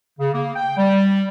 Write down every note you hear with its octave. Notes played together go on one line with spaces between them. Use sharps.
C#3
A#3
G5
G3